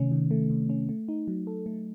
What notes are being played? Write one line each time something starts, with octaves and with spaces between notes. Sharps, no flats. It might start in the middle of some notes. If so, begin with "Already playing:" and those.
Already playing: C3 D#3 A3 C#4
D#3
A3
C3
C#4
A3
D#4
F#3
A4
A3